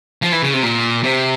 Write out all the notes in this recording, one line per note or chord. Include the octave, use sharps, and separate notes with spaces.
F3
E3
C#3
C3
A#2
C3